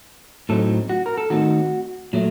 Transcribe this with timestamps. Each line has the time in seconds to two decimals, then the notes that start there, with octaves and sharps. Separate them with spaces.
0.49 A2 F#3 C4 D#4 A4
0.90 F#4
1.06 A#4
1.18 A4
1.30 D#3 A3 C4 D#4 F#4
2.13 A#2 F#3 A3